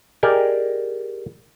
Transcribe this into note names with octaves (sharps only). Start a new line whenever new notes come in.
G4 G#4 A#4 D5 D#5 G#5